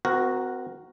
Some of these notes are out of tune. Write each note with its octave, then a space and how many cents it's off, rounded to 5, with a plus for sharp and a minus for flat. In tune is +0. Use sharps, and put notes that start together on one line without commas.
C4 -35 F#4 +0 A#4 +0